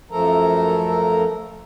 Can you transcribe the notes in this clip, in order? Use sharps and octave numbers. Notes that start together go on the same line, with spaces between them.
F#2 F3 A3 A4 A#4 A#5